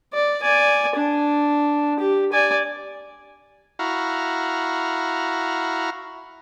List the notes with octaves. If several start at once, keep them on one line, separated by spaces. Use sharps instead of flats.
D5
D5 G#5
D4
G4
D5 G#5
E4 F#4 F5 A#5